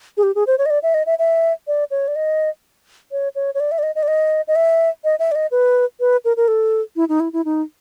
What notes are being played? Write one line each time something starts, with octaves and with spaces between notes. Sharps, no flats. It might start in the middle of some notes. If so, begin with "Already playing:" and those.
G#4
G4
G#4
C5
C#5
D#5
D5
E5
D#5
E5
E5
D5
C#5
D5
D#5
C#5
C#5
C#5
D5
E5
D5
D#5
D#5
D5
D#5
D#5
E5
D#5
E5
D5
D#5
B4
B4
A#4
A#4
A4
E4
D#4
E4
E4
D#4